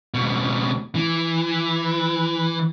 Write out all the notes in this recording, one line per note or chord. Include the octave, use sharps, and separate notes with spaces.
C#2 B2
E3